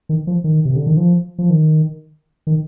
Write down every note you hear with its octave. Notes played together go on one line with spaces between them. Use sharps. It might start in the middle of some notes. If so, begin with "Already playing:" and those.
D#3
F3
D#3
C3
D3
D#3
F3
F3
D#3
D#3